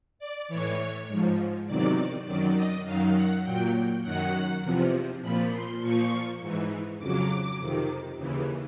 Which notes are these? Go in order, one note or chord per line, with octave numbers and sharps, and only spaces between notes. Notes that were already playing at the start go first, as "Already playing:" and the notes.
D5
A2 E3 C#5
G#2 F3
E2 C3 D#3 F#3 D5
F#2 D#3 F#3 D5
D#5
F#2 D#3 F#3 F5
F#5
A#2 F#3 G5
F#2 D#3 F#3 F#5
E2 C3 F3
A#2 F3 B5
C6
A#2 F3 C#6
G#2 E3
F2 C#3 F#3 D6
F2 C3 D#3
D#2 C#3 E3